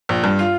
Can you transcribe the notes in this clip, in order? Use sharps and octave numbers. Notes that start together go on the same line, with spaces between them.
A#1
G2
F4